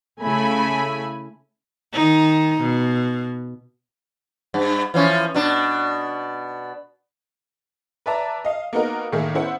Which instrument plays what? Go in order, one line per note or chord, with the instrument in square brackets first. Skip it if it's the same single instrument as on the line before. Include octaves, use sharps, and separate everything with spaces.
[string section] C#3 A3 E4 G#5 B5
[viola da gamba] D#3 D#4
B2
[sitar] G2
E3 F3 C#4
B2 D4
[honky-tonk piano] B4 D5 E5 A5 A#5
D#5 F5
A#3 B3 D#4 F#4 A#4
A2 D#3 A#3 G#4 E5
B3 C#4 E4 C5 F#5